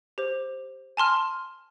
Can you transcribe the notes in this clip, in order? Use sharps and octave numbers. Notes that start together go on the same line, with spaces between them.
G4 C5
G#5 A5 C6 F6